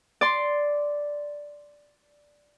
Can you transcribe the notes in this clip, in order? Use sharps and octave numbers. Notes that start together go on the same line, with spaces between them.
D5 C6